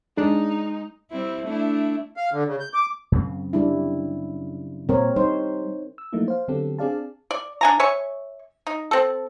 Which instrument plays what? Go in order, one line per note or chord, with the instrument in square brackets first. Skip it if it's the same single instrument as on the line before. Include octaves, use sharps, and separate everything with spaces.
[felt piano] G#3 [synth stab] D4 [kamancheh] D#4
[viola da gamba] G3 C4 E4
A3 D4 E4
[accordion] F5
D3
C#3
G6
D6
[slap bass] F#2 C#3 C4
[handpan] G3 D4 E4
[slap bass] A#2 G3 [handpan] C4 A#4 C#5
[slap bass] G3 [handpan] D#4 C5
[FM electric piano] E6
F3 F#3 A3 A#3 D#4 E4
C5 F5
D3 F#3 B3 C4 G4 A4
C4 D4 G#4 D5 F5 A5
[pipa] D5
D4 G#5 A#5
C#5 E5 G#5 C#6
D#4
C4 A4